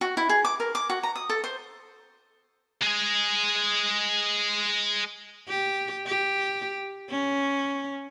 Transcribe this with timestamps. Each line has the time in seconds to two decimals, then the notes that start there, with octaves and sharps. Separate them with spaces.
0.01 F#4
0.17 E4
0.29 G#4
0.45 D6
0.60 A#4
0.75 D6
0.90 F#4
1.03 A#5
1.16 D#6
1.29 A4
1.44 C5
2.82 G#3 G#4
5.48 G4
6.06 G4
7.10 C#4